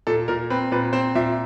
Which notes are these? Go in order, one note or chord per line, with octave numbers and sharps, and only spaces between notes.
A#2 A4
A#2 A#4
C4 B4
A#2 B4
C4 C5
A#2 E5